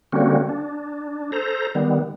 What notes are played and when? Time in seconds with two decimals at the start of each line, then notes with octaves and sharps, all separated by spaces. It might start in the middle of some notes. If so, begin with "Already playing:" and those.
0.12 D3 G3 A#3 C4 C#4 F#4
0.49 D4
1.32 A4 C5 A#5
1.75 D#3 G3 B3